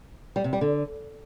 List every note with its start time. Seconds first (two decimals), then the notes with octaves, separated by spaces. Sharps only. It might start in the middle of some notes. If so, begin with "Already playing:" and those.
0.36 G3
0.44 C3
0.53 G3
0.61 D3